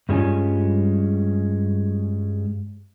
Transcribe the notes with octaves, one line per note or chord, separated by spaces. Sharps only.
G2 G3 G#3 C#4 F4 G#5